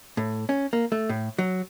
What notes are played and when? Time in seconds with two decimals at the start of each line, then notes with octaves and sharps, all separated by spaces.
0.17 A2
0.49 C#4
0.73 A#3
0.92 A3
1.09 A2
1.39 F#3